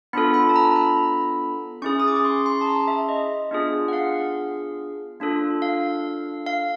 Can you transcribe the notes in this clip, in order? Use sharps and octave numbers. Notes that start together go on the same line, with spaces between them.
B3 D4 F4 A4 B5
B5
A5
A#5
B5
C#4 E4 G#4 C#6
D#6
D6
C#6
C6
C6
A5
A#5
E5
D#5
B3 D4 F4 G#4
F#5
F5
A#3 D4 F4 A4
F5
F5